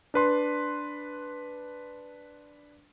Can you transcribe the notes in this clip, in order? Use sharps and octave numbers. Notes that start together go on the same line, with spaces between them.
D4 B4 C6